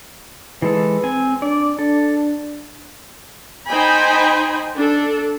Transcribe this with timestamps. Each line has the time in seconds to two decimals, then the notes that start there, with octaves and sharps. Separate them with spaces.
0.62 E3 G#3 A4 B4
1.03 C4 G#5
1.42 D4 D5
1.79 D4 A4
3.69 D#4 C5 D#5 G5 G#5 B5
4.77 D4 A4